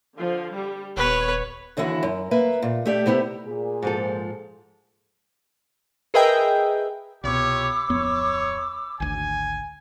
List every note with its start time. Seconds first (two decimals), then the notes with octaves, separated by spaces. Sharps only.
0.17 D3 F3
0.53 G3
0.97 D#1 B3 B4 C#5
1.77 D#2 D3 E3 E4 F#4
2.03 F#2
2.31 A#3 B4 E5
2.62 A#2
2.86 A3 G4 D5
3.06 C3 B3 E4 G4
3.46 A#2 G#4
3.82 G#2 F3 A4
6.14 G#4 A#4 B4 D#5 E5 G5
7.24 C2 B2 F4 G4 C#5 B5 D6 E6
7.89 D1 F2 B3 C#5
9.00 G#1 D2 G#5